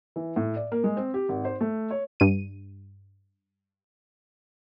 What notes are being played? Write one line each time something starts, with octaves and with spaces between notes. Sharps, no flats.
E3
A2
D5
A#3
G#3
C4
G4
G#1
C5
A3
C#5
G2 D#7